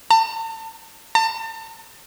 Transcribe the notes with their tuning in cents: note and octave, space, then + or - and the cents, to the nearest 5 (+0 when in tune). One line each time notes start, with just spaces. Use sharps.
A5 +35
A5 +35